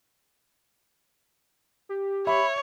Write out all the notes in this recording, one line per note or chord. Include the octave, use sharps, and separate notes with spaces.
G4
C#5 E5 B5